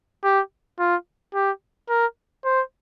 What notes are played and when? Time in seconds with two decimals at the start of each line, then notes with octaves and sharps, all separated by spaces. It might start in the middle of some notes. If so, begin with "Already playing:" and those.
0.24 G4
0.79 F4
1.34 G4
1.89 A#4
2.45 C5